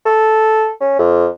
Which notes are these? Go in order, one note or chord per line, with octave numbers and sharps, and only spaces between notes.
A4
C#4
F2